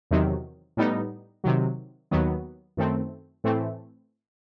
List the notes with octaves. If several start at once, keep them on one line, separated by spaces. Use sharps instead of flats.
E2 C3 D#3 F#3
A2 G3 B3 D#4
C3 D#3 F#3
D#2 D#3 F#3 B3
F#2 D#3 A3 C4
A2 E3 A3 C4